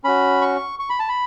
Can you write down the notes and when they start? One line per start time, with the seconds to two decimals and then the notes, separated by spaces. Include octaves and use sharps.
0.04 C#4 F#4 B5
0.41 C#6
0.79 C#6
0.89 B5
0.99 A5
1.09 B5